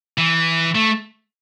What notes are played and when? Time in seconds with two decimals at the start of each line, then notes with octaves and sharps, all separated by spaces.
0.18 E3
0.75 A3